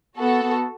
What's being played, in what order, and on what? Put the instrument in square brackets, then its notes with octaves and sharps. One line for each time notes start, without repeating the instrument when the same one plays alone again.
[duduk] B3 [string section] F#4 A4
[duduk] B3